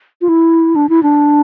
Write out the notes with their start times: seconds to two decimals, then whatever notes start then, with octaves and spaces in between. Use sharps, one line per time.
0.21 F4
0.29 E4
0.76 D4
0.89 E4
1.03 D4